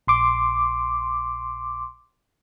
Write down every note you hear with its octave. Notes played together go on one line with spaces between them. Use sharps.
A#1 C6 D6